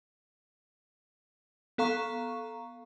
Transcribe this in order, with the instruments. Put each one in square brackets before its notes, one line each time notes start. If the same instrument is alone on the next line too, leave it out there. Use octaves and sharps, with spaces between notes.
[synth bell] B3 A4 F5 A#5 C#6